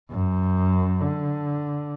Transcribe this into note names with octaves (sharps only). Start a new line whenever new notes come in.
F#2
D3